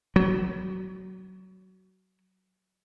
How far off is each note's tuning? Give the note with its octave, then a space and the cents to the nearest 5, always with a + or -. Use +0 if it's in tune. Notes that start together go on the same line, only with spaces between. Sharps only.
F#3 +20